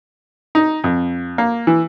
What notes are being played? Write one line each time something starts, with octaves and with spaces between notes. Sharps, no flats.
D#4
F2
A#3
E3